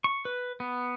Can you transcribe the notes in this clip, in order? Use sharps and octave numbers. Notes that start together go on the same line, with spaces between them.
C#6
B4
B3